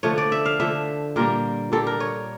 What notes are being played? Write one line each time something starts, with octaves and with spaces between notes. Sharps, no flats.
D3 F3 A3 C#5
D5
E5
F5
D3 F3 A3 E5
A#2 G3 A#3 A#4
A#2 G3 A#3 A4
A#4
C#5